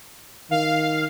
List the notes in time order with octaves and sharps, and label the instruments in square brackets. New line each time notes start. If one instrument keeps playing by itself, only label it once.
[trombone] D#3 [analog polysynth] F5